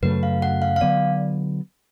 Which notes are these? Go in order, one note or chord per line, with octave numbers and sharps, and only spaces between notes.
F#2 C#3 F#3 A3 B4
F5
F#5
F5
F5
D3 F#3 B3 D5